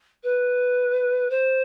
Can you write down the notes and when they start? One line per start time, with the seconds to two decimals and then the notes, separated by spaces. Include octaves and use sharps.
0.23 B4
1.30 C5